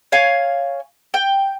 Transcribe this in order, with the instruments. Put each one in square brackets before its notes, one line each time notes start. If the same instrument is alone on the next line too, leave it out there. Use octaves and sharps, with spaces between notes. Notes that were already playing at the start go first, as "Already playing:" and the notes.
[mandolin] C#5 F5 G#5
G5